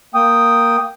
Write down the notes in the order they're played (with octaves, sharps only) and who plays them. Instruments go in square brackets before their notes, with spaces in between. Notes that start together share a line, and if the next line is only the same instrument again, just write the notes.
[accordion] A#3 G5 D#6